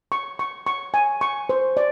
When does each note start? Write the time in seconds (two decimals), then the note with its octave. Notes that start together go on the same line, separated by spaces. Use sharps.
0.12 C#6
0.39 C#6
0.66 C#6
0.94 G#5
1.21 C#6
1.49 C5
1.77 D5